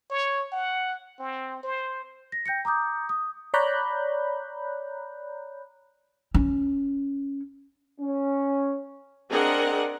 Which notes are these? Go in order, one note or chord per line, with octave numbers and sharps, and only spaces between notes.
C#5
F#5
C4
C5
A#6
G5 G6 A#6 C#7
A#5 D6 D#6 G6
D#6
C#5 D5 A#5 B5 F#6 G6
C#4
C#4
C4 D4 G#4 A#4 D#5 F#5